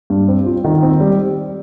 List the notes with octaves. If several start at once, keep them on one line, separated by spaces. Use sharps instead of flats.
G2
C4
F4
D#3
C4
G3